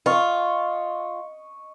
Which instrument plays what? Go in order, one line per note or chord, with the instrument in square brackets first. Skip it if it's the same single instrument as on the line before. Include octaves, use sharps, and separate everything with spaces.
[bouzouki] F4 [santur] D#5 C#6